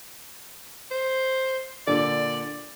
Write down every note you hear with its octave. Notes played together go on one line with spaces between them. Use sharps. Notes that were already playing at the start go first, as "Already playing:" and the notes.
C5
A#2 D3 D5